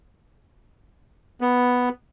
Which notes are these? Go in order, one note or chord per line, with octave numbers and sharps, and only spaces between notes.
B3